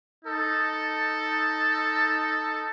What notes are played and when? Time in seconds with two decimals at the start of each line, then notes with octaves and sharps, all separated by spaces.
0.25 D#4 A4